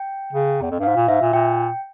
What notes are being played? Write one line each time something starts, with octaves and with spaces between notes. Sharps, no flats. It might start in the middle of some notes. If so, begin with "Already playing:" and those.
Already playing: G5
C#3
E2
F2
G2
G#2 F5
A#2
G#2 E5
A#2
A#2 G5